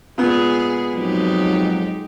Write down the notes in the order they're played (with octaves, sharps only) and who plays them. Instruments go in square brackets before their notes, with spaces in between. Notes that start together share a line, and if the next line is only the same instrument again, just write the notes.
[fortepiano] A#2 B3 [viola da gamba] G#3 G#4
[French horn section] F2 G#2 F#3 [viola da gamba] G#3 D#4 G4